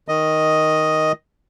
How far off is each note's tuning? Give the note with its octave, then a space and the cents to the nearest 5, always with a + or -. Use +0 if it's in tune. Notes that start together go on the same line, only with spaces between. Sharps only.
D#3 +5 D#5 +0